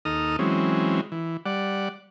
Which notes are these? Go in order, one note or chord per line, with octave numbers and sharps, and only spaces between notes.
D#2 D#4 A4 A#5 D#6 F6
E3 F#3 G#3 C4 C#4
E3
G3 D5 F#5